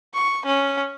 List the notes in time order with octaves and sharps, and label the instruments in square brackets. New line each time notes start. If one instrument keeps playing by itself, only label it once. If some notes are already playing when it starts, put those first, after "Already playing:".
[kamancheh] C#6
C#4